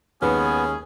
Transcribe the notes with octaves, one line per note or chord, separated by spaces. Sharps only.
D#2 G#3 B3 C#4 G#4 B4